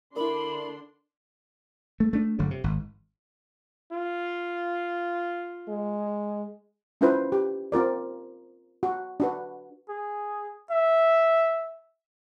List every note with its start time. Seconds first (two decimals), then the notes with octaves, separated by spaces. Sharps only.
0.16 D3 D4 E4 A#4 D5 B5 C6
2.00 A3
2.13 A3 D4
2.39 G1 D3 F#3
2.51 C3
2.64 G#1
3.92 F4
5.68 G#3
7.01 C#4 D4 E4 F4 B4 C5
7.32 G4
7.72 C4 F4 A#4 D5
8.83 F#4
9.20 D4 F#4 B4
9.89 G#4
10.71 E5